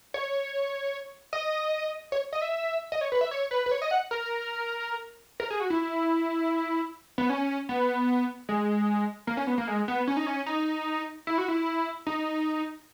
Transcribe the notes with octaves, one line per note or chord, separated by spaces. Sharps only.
C#5
D#5
C#5
D#5
E5
D#5
C#5
B4
E5
C#5
B4
B4
C#5
D#5
F#5
A#4
A#4
G#4
F#4
E4
B3
C#4
B3
G#3
A#3
C#4
B3
A#3
G#3
B3
C#4
D#4
C#4
D#4
E4
F#4
E4
D#4